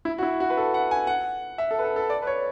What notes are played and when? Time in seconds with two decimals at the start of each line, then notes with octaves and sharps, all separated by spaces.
0.05 E4
0.18 F#4
0.23 E4
0.40 F#4
0.50 B4
0.57 A4
0.74 F#5
0.91 G#5
1.07 F#5
1.58 E5
1.71 A4
1.79 B4
1.84 A4
1.96 A4
2.10 D5
2.22 B4
2.27 C#5